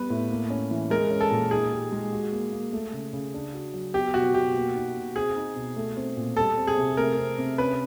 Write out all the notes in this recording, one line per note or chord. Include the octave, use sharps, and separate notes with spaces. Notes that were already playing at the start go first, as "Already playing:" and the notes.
Already playing: G3 B3 B4
A2
A#3
C#4
E3
G#3 A#4
C#4
A4
A#2
D#4 G#4
G4
G#3
F#4
A#3
A#3
A3
C#3
C#3
D4
F#4
F#3
B3 G4
B2 F#4
B2 G4
A#3
D#4
B2
C4 G#4
D#4
B2
A3
C4
A#2
G3 A4
C4
G#4
C3
A3 A#4
C4
C3
C#4 B4